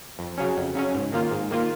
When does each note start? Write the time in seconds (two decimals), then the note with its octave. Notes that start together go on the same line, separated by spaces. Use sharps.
0.19 F2
0.38 C#3 F#3 C#4
0.57 F2
0.75 C#3 F#3 C#4
0.94 G#2
1.12 D#3 A#3 F4
1.31 G#2
1.51 D#3 A#3 F4